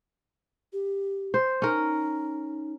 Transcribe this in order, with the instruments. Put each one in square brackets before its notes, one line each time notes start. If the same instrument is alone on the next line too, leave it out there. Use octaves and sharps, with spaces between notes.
[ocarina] G4
[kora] C5
[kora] C#4 A#4 [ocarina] D#4